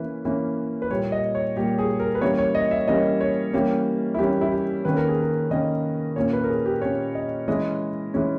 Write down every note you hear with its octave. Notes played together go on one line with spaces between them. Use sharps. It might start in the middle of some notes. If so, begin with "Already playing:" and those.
Already playing: E3 A#3 C#4 B4
E3 A#3 C#4
B4
A#2 G3 A#3 C#5
D#5
C#5
A#2 G3 A#3 G4
G#4
A#4
B4
E3 G3 A#3 C#4 C#5
C#5
D#5
E5
E3 G3 A#3 C#4 D#5
C#5
E3 G3 A#3 C#4 G4
E4
E3 G3 A#3 C#4 G4
E4
G4
D#3 A#3 C#4 B4
A#4
G#4
A#4
D#3 A#3 C#4 D#5
A#2 A#3 C#4 C#5
B4
A#4
G#4
G4
A#2 A#3 C#4 C#5
D#5
E3 G#3 C#4 D#5
E3 G#3 C#4